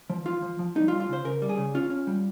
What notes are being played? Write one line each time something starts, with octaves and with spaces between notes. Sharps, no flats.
F3
F3 F4
F3
F3
G3 D#4
F4
G3
F4
C#3 C5
C#3 A#4
G3
G#4
C#3
C#4 F4
C#4
G3